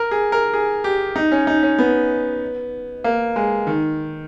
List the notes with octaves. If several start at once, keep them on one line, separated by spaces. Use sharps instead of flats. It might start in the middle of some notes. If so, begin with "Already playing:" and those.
Already playing: A#4
G#4
A#4
G#4
G4
D#4
C#4
D#4
C#4
B3
A#3
G#3
D#3